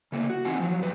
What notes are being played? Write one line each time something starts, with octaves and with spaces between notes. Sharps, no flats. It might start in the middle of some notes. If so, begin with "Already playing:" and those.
C#3 A3 A#3
F#4
E3 C4 D#4 F4 F#5 G#5
F3 F#3
F#2 B4